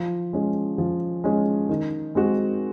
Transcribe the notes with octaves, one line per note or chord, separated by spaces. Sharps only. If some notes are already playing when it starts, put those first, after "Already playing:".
Already playing: F3
G#3 C#4
F3
G#3 C#4
D#3
G#3 C4 F#4